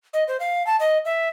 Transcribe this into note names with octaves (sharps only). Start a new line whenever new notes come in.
D#5
C5
F5
A5
D#5
E5